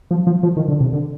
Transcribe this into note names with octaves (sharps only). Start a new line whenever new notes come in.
F3
F3
F3
D#3
D3
C3
D3